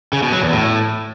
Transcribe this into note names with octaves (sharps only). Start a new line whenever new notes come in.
C#3
B2
F#3
E2
A2